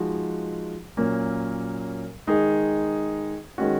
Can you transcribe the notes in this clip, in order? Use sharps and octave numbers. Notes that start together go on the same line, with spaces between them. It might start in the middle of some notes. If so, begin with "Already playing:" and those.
Already playing: F3 G#3 D#4 F#4
A#2 F#3 A#3 C#4
D#3 G#3 D#4 G#4
D#3 G#3 C#4 F#4